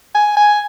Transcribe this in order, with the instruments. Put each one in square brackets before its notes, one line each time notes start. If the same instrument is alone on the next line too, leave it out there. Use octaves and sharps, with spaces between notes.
[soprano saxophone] G#5
G#5